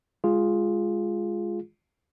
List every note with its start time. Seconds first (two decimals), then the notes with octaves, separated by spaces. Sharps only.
0.24 G#3 F4 G#4